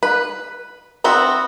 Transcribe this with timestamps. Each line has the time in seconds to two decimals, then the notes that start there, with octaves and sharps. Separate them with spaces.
0.03 B4
1.04 B3 C4 E4 F#4